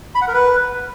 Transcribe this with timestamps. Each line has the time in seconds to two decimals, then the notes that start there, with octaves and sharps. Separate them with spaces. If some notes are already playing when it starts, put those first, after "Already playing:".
0.15 B5
0.21 F#5
0.28 A#4
0.34 B4